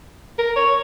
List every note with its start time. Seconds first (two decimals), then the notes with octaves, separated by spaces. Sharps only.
0.38 A#4
0.56 C#5